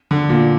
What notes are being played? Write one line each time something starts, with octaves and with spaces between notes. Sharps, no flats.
D3
A#2